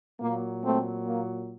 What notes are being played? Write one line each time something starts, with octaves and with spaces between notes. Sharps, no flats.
A#2 F#3 A#3
A3 C4
A#3